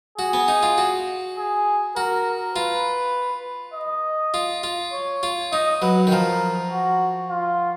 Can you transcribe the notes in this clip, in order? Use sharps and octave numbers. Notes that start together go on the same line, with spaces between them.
F#4 G#4
B3
D#4
F4
F#4
G#4
F#4 A#4
F4 B4
D#5
F4
F4
C#5
F4
D#4 D#5
F#3 B4
D#3
F3 A#4
F#4
F4